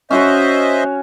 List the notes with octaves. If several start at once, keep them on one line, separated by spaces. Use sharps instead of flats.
C#4 F#4 C5 C#5 D#5 E5